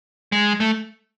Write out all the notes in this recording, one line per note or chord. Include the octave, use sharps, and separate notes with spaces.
G#3
A3